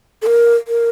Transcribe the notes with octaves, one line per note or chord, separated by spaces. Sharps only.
A4
A#4
A#4